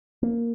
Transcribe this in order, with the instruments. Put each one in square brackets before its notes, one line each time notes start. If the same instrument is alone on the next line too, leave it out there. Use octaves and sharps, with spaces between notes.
[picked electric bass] A#3